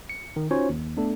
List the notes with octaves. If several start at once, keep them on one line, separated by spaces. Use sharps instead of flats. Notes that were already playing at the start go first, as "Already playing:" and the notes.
C#7
D#3
C#4 D#4 F4 F#4 C5 C#5
D#2
A3 B3 D4 A4